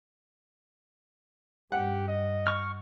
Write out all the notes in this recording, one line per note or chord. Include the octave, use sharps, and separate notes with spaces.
G2 G4 F#5
D#5
C#6 F6